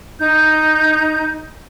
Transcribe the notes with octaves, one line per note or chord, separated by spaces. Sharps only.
D#4 G6